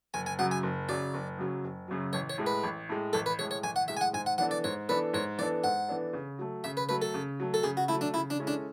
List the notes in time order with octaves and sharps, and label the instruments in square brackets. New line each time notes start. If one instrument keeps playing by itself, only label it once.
[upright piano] F#1 [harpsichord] G#5
[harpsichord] G#5
[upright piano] F#2 C#3 F#3 [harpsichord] F#5
[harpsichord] G#5
[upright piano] F#1
[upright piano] F#2 C#3 F#3 [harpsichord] D5
[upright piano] F#1
F#2 C#3 F#3
F#1
F#2 C#3 F#3
[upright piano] A1 [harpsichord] C#5
[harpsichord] C#5
[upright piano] A2 G#3
[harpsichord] B4
[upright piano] A1
A2 G#3
[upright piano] A1 [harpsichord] A4
[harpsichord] B4
[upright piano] A2 G#3 [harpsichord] C#5
[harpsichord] C#5
[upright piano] A1 [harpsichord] G#5
[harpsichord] F#5
[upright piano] A2 G#3 [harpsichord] E5
[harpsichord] G#5
F#5
[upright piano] G#2 [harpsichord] G#5
[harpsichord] F#5
[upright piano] E3 B3 D4 A4 [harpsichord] F#5
[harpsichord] D5
[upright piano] G#2 [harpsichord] C#5
[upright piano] E3 B3 D4 A4 [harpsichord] B4
[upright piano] G#2 [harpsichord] C#5
[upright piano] E3 B3 D4 A4 [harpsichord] D5
[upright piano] G#2 [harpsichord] F#5
[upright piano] E3 B3 D4 A4
C#3
F#3 A3
[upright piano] C#3 [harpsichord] E5
[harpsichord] B4
[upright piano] F#3 A3 [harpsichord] B4
[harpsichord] A4
[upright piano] C#3
F#3 A3
[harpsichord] A4
[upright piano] C#3 [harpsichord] G#4
[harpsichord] F#4
[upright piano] F#3 A3 [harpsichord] E4
[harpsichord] D4
[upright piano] C#3 [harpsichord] E4
[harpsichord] D4
[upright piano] G#3 C#4 E4 A4
[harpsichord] D4